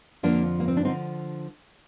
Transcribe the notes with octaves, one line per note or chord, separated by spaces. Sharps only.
F2 D3 F3 A#3 D4
A#3
C4
D4
D3 F3 C4 D#4